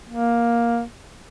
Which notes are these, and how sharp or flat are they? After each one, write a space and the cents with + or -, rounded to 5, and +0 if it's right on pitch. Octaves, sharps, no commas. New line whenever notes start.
A#3 +10